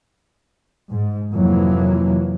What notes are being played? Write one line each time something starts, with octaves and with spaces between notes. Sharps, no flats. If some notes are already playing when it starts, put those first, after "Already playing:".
G#2
F2 C3 E3 F#3 A#3